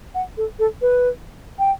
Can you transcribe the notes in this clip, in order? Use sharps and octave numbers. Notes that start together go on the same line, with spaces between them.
F#5
A4
A4
B4
G5